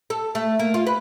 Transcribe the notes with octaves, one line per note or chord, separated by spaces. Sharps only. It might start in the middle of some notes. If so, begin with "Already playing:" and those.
A4
A3
A#3
F4
B4